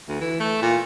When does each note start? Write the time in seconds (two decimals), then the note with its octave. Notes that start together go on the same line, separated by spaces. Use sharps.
0.08 D2
0.21 E3
0.40 A3
0.62 A#2